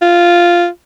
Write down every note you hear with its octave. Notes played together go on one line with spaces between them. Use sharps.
F4